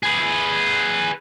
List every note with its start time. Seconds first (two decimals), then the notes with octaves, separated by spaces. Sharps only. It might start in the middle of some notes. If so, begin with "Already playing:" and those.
0.03 G#4 B4